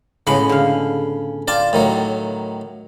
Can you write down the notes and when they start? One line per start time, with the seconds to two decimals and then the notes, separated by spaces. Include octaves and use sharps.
0.27 A2 C#3 G#3 B3 B5
0.49 D3 F5
1.48 F4 D5 G5 A5
1.73 A2 D#3 F#3